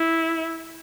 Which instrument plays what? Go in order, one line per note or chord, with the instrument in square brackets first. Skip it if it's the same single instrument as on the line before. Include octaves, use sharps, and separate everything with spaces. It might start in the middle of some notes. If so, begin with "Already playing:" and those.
Already playing: [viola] E4